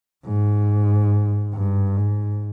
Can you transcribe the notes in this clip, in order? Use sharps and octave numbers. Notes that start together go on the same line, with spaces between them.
G#2
G2
G#2